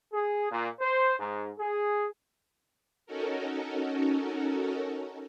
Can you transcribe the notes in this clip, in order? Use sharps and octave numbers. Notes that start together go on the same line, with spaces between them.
G#4
A#2
C5
G#2
G#4
C#4 D#4 F#4 A4 A#4